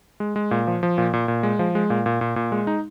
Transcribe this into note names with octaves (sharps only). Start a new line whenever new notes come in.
G#3
G#3
A#2
F3
F3
A#2
A#2
A#2
G#3
F3
G#3
A#2
A#2
A#2
A#2
G#3
D#4